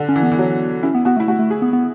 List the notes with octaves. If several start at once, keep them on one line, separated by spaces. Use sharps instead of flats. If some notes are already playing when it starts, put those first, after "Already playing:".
Already playing: D3
C#4
E3
B3
E3
F#3
C#4 E4
B3
B3 F#4
A3
E4
A3 F#4
A3
G#4
B3
B3